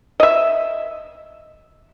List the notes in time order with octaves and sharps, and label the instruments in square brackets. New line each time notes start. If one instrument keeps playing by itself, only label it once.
[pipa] D#5 E5